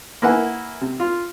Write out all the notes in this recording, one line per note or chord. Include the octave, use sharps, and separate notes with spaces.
A#3 E4 B4 F#5 G#5
C3
F4